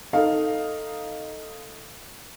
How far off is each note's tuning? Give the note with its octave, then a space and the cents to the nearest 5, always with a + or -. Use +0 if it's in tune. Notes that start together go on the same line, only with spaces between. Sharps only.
D#4 +0 A4 +15 F5 +5